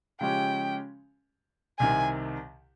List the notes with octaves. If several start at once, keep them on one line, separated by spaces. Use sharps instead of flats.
C#3 F3 G#3 C#4 G4 G5
C2 C3 D#3 G#5